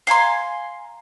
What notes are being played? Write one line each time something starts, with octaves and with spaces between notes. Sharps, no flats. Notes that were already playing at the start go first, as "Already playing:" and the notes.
F5 G#5 A#5 C6